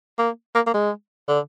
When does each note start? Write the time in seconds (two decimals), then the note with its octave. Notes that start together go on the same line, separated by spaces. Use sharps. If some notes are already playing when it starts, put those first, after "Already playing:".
0.18 A#3
0.55 A#3
0.66 A#3
0.74 G#3
1.28 D3